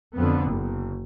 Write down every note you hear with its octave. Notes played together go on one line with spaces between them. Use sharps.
F2 D3 B3
F#1